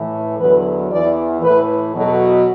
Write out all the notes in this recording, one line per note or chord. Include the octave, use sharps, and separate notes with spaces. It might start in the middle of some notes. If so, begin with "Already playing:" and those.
Already playing: A2 E3
E2 D3 F#3 B4
E2 E3 D5
A2 E3 B4
E2 B2 F#3 A4